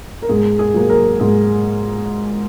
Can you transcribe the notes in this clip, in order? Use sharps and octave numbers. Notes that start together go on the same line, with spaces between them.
A#4
G#2 G#4
G#4
F#3 A#3
A#4
G#2 G#4